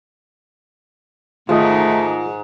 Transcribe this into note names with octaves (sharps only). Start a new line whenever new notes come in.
G#2 D#3 A3 F4 G#4 D#5